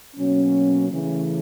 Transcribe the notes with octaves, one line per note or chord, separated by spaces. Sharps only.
B2 F#3 A#3 C#4
C#3 E3 A3 C#4